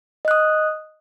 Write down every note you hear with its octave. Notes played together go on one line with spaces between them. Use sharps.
D#5 D#6 F#6